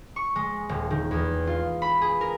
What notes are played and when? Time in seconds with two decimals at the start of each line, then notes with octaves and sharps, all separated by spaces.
0.16 C#6
0.36 G#3
0.69 D#1
0.90 D#3
1.11 E2
1.47 F4
1.82 B5
2.01 G#4
2.21 A#4